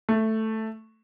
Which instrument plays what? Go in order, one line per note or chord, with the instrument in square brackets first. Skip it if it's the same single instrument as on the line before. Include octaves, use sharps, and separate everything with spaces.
[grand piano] A3